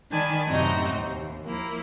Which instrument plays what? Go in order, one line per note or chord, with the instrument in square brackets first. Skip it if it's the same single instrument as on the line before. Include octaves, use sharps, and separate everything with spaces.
[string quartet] D#3 D5 G#5 A5 B5
F#2 A2 C3 C4 D#4 F#4
D#2
F3 A#3 E4